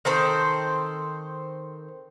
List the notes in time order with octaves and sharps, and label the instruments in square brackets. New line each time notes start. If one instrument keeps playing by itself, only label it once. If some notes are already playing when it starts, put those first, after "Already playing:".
[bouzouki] D#3 C4 A4 C5